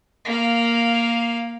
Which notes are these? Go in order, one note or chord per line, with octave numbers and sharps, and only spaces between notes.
A#3 F5